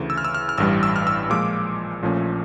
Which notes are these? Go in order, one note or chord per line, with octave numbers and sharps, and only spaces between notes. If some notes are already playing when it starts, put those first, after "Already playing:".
Already playing: D2 C#3 E3
E6
F6
E6
F6
F6
A1 G2 E3 G3 E6
E6
F6
E6
A#2 F3 G#3 D6
A#1 A#2 F3 A3 C#4